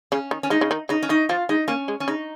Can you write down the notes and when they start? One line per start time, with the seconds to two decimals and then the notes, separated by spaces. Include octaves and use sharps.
0.12 C#3 C#4
0.31 D#3
0.43 C#4
0.50 G#3 D#4
0.61 C#3
0.71 D#3
0.89 C#3 D#4
1.03 C#4
1.09 D#3 D#4
1.29 F3 F4
1.49 G#3 D#4
1.68 A#3 C#4
1.88 G#3
2.00 C#4
2.08 C#3 D#4